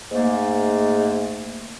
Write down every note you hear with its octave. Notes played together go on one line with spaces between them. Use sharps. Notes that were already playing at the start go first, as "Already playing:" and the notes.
G#2 A3 A#3